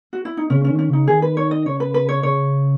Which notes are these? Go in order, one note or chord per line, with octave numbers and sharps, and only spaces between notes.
F#4
E4
D#4
C#3 C#4
C#4
D#3
C#4
C#3 D#4
D#3 G#4
B4
C#5
D#5
C#3 C#5
B4
B4
C#5
C#3 C#5